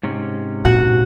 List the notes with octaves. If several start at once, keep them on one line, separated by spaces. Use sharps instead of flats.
G#2 C3 C#4
A#2 F#4 F#5